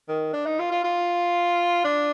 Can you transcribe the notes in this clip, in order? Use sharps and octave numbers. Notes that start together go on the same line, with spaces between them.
D#3
D4
D#4
F4
F4
F4
D4